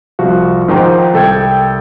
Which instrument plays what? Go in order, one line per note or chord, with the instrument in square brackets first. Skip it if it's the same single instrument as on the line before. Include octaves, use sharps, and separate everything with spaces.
[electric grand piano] C2 F3 F#4 F5
G#2 D#3 F3 D#4 C5 G5
C2 A4 G5 G#6